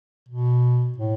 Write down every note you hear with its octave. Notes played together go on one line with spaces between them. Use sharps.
B2
A2